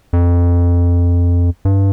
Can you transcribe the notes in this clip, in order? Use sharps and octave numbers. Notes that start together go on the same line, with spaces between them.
F2
G2